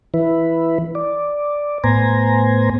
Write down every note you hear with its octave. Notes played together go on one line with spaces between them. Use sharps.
E3 E4 B4
D5
A2 B3 C5 G#5 A#5